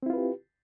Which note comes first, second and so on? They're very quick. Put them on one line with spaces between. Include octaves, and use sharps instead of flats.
C4 E4 F4 B4 G4